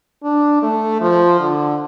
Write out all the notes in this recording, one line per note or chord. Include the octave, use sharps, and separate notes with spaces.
D4
A3
F3
D3